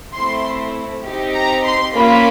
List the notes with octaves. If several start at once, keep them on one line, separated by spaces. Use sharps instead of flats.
A3 C4 E4 C6
C4 D#4 G4
A#5
C6
A#3 C#4 F4 B5